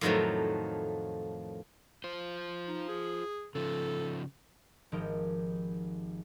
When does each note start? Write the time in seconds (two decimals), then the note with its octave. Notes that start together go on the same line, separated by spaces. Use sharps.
0.01 F2 A2 D#3 F3 F#3 A3
2.04 F4 C5
2.68 D#4
2.89 G#4
3.55 C#3 F3 A4
4.92 G#1 F3 D#4 G4 A#4